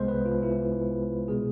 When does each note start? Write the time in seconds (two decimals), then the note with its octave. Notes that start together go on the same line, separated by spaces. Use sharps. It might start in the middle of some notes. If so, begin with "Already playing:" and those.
Already playing: C2 C3 G#3 B3 C5
0.08 B4
0.25 F4
0.43 E4
1.28 B2 G#3 B3 G#4